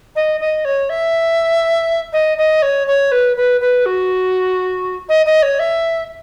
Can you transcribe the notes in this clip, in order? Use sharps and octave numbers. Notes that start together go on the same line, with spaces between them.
D#5
D#5
C#5
E5
D#5
D#5
C#5
C#5
B4
B4
B4
F#4
D#5
D#5
C#5
E5